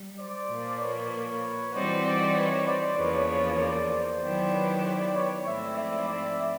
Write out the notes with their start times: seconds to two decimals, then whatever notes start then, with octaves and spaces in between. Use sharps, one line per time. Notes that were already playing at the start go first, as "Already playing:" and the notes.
Already playing: G3
0.19 C5 D5
0.50 A#2 F3 A#3
0.80 B4 C#5
1.73 E3 G3 C4 D#4 F#4 C5 D5
2.04 C5 D5
2.35 B4 C#5
2.66 C5 D5
2.97 E2 C#3 F3 A#3 B4 C#5
3.59 C5 D5
3.90 C5 D5
4.21 D#3 F#3 B3 E4 G4
4.52 B4 C#5
4.83 C5 D5
5.14 B4 C#5
5.45 G#2 F3 A3 C4 E4 D5 E5
5.76 D5 E5
6.07 D5 E5